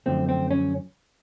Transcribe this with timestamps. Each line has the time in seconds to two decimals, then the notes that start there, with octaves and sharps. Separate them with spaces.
0.06 F#2 D3 F3 A3 C4
0.29 C4
0.51 C#4